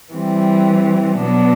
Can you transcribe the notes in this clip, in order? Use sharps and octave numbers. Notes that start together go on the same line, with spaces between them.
E3 G3 C4
B2 F#3 B3 D4